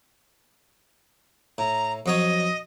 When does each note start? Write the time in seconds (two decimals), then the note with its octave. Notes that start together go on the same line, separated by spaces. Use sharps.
1.58 A2 A#5
2.06 F2 F#3 C#5 D#5